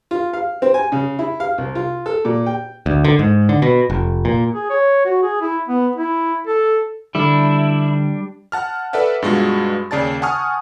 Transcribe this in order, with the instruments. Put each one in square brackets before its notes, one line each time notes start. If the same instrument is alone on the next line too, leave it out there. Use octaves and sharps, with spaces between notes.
[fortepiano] F4
F5
C4
G#5
C#3
E4
F5
C2
F4
A4
A#2
G5
[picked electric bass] D2
D3
G#2
D3
B2
F1
A#2
[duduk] G#4
C#5
F#4
G#4
E4
B3
E4
A4
[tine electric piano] D3 [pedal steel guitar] G3 D4 [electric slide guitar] E4
[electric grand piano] F#5 A5 F6
A4 B4 D5 E5 F#5
G2 B2 G#3 F4 F#4
D#2 C#3 D5 A5 A6
F#5 G#5 A5 C#6 D#6 F6